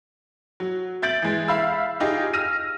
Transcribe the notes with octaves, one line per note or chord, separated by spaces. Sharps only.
F#3
E5 G6 A6 D7 F#7
E3 G#3
E5 F5 B5 E6
D#4 F4 G4 G#4 D#5
E6 F6 A#6 D#7